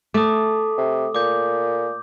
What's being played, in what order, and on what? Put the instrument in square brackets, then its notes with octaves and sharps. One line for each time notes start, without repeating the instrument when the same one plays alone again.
[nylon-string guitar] A3 [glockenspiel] D6 D#6
[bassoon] C3
[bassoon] A#2 [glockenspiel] D6 G6